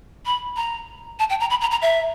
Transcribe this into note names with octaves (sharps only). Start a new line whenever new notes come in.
B5
A#5
A5
G5
A#5
B5
A#5
A#5
E5